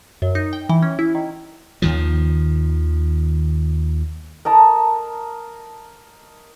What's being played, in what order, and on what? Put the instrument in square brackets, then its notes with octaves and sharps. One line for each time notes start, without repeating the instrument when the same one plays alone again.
[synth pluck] F#2
D#4
G5
E3
C#4
E4
D#3
[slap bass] D#2 D#3 F3
[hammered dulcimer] A#4 D#5 A5